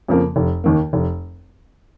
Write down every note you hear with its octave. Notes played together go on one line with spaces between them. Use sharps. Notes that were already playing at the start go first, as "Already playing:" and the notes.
F2 C#3 F3 A#3
F1
D#2 D#3 A#3
F1